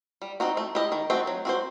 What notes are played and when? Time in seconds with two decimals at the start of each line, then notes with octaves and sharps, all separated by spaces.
0.22 G3
0.40 C4 D#4 F#4
0.57 A3
0.75 E4 G4 D#5
0.92 D#3
1.10 A3 C4 F#4 C5
1.27 F#3
1.45 C4 F#4 C5